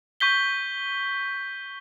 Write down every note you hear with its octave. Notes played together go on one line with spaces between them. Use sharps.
C#6 G6 B6 G7